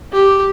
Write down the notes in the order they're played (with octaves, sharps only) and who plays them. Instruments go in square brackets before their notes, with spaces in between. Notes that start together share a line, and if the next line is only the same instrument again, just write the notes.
[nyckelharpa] G4